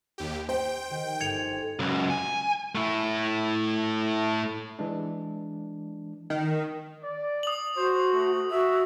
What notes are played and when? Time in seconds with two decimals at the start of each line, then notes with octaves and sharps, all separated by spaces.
0.18 D#2 G4
0.49 C5 G5
0.90 D#3 G4
1.21 G1 G#6 C#7 F7
1.80 C#2 F#2
2.10 G#5
2.75 A3 E4
4.79 E3 G#3 D4
6.30 D#3
7.03 D5
7.43 D#6 F#7
7.77 F#4 C5
8.13 A3
8.51 F#4 E5